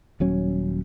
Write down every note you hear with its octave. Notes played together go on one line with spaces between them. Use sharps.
D#1 F#3 C#4